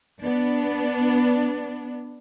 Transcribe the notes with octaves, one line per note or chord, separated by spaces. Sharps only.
B3 D4